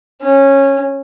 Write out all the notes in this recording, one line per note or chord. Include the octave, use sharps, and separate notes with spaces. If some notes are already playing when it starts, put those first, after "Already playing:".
C#4